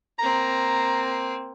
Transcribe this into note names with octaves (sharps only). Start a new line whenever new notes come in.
A#3 C4 A#5